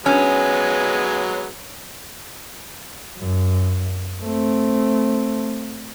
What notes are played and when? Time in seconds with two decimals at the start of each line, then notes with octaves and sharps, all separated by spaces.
0.06 F#3 G#3 B3 C#4
3.18 F#2
4.23 A3 C4